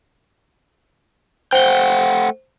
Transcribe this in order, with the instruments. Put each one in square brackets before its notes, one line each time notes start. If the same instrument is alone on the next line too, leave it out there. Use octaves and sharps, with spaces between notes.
[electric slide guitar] A3 F#5 G5 [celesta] C5 G7